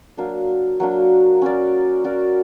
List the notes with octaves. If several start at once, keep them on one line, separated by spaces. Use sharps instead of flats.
F#3 A#3 D4
F#3 A#3 D4
C#4 F#4 A#4 D5
C#4 F#4 A#4 D5